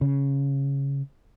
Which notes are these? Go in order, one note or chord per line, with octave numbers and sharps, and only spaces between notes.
C#3